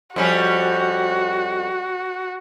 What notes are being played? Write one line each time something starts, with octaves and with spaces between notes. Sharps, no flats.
F2 G3 C#4 F#4